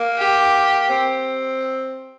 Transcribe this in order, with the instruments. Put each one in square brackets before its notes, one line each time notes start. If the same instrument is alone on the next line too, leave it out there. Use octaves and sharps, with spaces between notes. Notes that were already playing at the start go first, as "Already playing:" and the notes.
Already playing: [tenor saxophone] A#3
[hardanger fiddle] G4
[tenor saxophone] C4